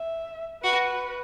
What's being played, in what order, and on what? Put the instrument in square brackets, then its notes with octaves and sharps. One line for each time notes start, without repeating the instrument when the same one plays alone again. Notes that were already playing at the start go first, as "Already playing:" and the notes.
Already playing: [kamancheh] E5
[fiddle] F#4 [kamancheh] B4